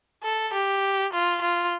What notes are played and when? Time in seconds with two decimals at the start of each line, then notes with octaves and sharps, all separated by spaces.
0.24 A4
0.53 G4
1.13 F4
1.42 F4